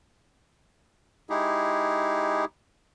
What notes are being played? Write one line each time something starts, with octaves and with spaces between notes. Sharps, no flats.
G#3 D#4 E4 G4 G#4